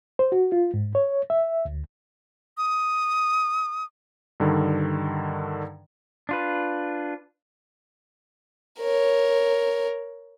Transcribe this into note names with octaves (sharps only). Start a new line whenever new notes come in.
C5
F#4
F4
G#2
C#5
E5
D2
D#6
G2 D3 D#3
D4 F4 B4
A#4 C#5